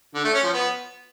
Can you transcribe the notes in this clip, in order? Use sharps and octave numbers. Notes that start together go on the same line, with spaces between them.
D3
A3
C#4
F3
B3